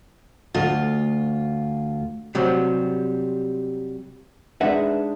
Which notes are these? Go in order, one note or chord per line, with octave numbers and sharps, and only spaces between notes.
D2 F4
C3 F#3 G3
G#3 D4 D#4 B4 E5 F#5